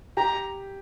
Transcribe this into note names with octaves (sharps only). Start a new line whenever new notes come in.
G4 A#5